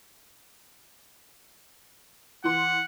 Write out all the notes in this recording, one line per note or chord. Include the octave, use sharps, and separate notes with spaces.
E3 F#5 C6